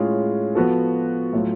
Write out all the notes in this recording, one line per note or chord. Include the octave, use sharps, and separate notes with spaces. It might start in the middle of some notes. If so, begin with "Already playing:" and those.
Already playing: A2 G#3 C#4 F4 G#4
F3 B3 F#4 A4
A2 F#3 A3 F4